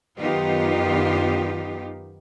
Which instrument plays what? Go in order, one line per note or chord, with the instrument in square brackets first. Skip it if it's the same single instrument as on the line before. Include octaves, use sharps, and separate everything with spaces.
[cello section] F#2 D#3 B3 D#4 F4 G4